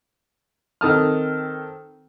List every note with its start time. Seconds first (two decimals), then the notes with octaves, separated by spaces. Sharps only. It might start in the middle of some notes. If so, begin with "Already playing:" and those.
0.81 D#3 C4 A4 A5 D#6 F6